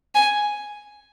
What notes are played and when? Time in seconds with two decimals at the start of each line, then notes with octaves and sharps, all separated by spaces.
0.15 G#5